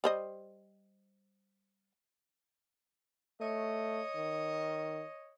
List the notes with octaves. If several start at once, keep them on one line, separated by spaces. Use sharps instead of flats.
G3 C5 D#5
A3 C#5 D#5
D#3